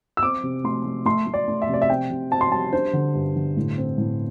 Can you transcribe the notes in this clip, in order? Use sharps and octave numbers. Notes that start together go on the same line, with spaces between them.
E6
C4 D6
C3
A3 C6
A3
A3 C6
A3
D5
A3
E5
C3 D5
E5
C4 G5
C3
C4 A5
C6
G3 A5
D4 C5
D3
G2
D3
A2
C4
A2